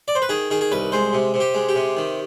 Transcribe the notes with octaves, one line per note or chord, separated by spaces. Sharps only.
D5
C5
B4
D#3 G#4
D#3 G#4
G#4
C2 B4
G#3 C5
C3
C3
G4
G#3
G4
C3
D#3